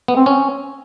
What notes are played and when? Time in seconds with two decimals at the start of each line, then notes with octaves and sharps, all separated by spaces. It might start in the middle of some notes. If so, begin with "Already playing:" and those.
0.08 B3
0.17 C4
0.26 C#4